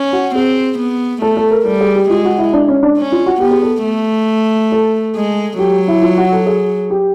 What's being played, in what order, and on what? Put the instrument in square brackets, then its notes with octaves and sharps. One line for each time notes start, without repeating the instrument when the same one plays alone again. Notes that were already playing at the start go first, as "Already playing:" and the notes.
Already playing: [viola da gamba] C#4
[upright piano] F#4
[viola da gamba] C4 [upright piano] G#4
[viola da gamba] B3
[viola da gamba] A3 [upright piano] A4
[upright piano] A4
A#4
[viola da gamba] G3 [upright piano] A4
[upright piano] G#4
G4
[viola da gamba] G#3 [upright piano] F4
[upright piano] F#4
E4
D4
C#4
D4
[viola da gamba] C#4
[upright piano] F4
F#4
[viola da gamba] B3 [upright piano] G4
[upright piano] G#4
A4
[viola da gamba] A3
[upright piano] A4
[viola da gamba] G#3
[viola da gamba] F#3 [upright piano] G4
[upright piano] E4
F4
F#4
A4
G#4
G4